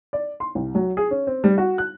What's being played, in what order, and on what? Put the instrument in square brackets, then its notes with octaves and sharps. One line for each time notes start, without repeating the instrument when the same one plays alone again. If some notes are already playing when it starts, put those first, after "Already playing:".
[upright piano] D5
C6
C2
F#3
G#4
C#4
C4
G3
F#4
F#6